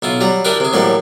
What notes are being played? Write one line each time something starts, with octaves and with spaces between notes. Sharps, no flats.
B1 E4 F4
F#3 G3 A#5
D4 E4 G4 A#4 B4
C3 G#4
A2 E3 F#3 G3 A#3 C#6